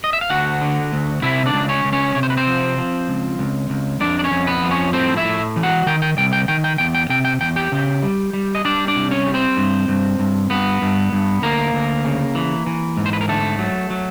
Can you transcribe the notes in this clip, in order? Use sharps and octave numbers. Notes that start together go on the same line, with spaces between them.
D#5
E5
F5
D2 F#4 F#5
D3
D2
C3 E4 E5
D4 D5
C#2
C#4 C#5
C#2
C#4 C#5
C3 C#5
C5
B4
C4 C5
F3
F3
C#2
C#2
C#2
F2 D4 D5
D5
C#4 C#5
F2
B3 B4
F3
C#4 C#5
A2 C4 C5
E4 E5
A2
E3
F#4 F#5
D#3 G5
G5
C2 G5
G5
D#3 G5
G5
E2 G5
G5
C3 G5
G5
E2 G5
G4 G5
C#3
G3
G3
D#5
G3 D4 D5
D4 D5
C2
C#4 C#5
G3
C4 C5
G2
G2
G2
G2 B3 B4
G2
G2
D2 A#3 A#4
D2
C#3
E3
E3
G#2
C5
B4
A#4
D3 A3 A4
F#3
F#3